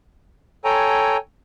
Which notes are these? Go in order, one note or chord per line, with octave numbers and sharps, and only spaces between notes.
A4 C#5 G5 G#5 A#5